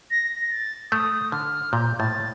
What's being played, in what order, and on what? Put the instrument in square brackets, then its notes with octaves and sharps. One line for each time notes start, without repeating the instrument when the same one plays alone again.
[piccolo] A#6
A#6
A6
[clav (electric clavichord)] A3 [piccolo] D#6
[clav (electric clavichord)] D3 [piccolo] F6
[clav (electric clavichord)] A#2 [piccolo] G6
[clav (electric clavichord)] A2 [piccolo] A6